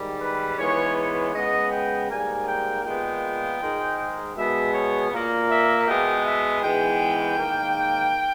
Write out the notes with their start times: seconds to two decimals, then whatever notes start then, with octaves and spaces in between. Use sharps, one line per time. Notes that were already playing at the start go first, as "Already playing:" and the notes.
Already playing: G#2 D#3 G3
0.21 B4
0.58 G#2 E3 G#3 B3 C#5
0.96 C#5
1.34 C#3 G#3 B3 D#5
1.71 G5
2.09 G#2 G3 A#3 G#5
2.47 G5
2.85 A#2 G#3 B3 G5
3.60 G#2 D#3 G#3
4.35 B2 G#3 B3 E5
4.74 C#5
5.11 A#2 A#3
5.49 E5
5.87 B2 G#3 B3 G5
6.25 E5
6.62 G#2 E3 G#3 B3 G5
7.37 G#2 D#3 A#3